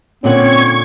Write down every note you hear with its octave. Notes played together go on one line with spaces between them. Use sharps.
A#2 D3 C4 C#4 F#5 C#6 G#6